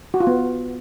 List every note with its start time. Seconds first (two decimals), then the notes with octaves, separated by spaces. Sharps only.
0.14 F#4
0.20 F4
0.27 B3